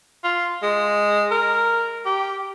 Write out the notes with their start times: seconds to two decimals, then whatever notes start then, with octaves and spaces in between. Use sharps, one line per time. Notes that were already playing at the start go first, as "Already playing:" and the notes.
0.24 F4
0.62 G#3
1.31 A#4
2.05 G4